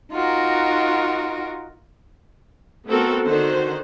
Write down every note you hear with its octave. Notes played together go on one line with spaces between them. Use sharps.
D#4 F4 F#4 A#4
A3 B3 C4 F#4 A4 A#4
D3 D#3 F#4 C5